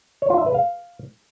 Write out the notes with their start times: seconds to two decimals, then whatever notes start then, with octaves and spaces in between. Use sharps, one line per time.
0.22 C#5
0.30 F4
0.38 E5
0.46 B4
0.54 F5